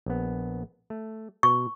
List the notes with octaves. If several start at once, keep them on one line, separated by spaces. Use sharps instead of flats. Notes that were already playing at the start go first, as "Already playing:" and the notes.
A#1 B3
A3
B2 C#6